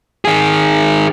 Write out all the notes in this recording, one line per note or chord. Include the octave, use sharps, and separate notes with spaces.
D#3 G#4